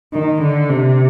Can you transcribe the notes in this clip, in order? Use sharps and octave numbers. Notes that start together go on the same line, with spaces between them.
D#3
D3
C3